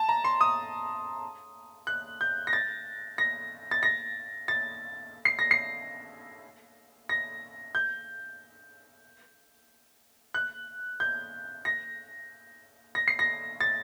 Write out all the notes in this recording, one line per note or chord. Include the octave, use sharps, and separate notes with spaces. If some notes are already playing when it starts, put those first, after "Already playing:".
Already playing: A5
A#5
C6
D#6
F#6
G6
A#6
A6
A#6
A6
A#6
A6
C7
A#6
C7
A#6
G6
F#6
G6
A#6
A#6
C7
A#6
A6